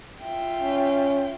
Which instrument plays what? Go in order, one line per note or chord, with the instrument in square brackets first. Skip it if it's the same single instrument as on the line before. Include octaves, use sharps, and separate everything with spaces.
[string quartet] F4 E5 G5
[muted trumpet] C#4